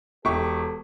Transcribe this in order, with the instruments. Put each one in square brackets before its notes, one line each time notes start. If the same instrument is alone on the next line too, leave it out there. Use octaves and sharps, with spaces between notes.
[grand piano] E1 G4 C#6 [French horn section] A4